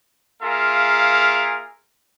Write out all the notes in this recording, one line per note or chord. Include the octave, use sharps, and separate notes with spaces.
A#3 F4 G#4 A#4 E5 F5